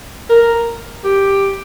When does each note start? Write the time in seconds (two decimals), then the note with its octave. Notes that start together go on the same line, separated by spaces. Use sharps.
0.29 A#4
1.04 G4